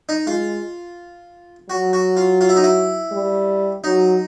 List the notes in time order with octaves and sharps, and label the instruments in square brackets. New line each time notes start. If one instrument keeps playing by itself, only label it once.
[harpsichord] D#4
[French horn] G#3 [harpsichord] F4
[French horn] F#3 [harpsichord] F#4
[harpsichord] F#4
F4
F4
E4
D#4
E4
[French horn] G3
[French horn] F#3 [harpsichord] D#4